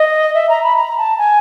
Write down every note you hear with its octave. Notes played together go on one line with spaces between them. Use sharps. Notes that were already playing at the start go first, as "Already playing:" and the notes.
Already playing: D#5
E5
A#5
B5
A#5
A5
G#5